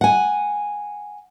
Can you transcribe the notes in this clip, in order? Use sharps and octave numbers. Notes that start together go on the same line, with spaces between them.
F#5 G#5